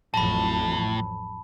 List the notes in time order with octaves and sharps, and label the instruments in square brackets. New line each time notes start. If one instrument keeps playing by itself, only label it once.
[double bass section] A1 F2 F#3 [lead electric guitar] A2 [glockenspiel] A5 B5